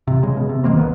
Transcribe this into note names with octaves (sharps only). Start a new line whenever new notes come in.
C3
C#3 G#3
B2
C3
G1 D#3 A#3 C4
E1 B1 B3